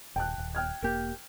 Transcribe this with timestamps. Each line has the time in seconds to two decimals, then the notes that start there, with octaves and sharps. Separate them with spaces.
0.16 D#1 G5 A5 F#6
0.38 D#1
0.55 G5 F6 G#6
0.82 E1 A#3 G4 A#4